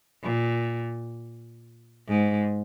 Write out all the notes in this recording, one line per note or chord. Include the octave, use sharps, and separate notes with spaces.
A#2
G#2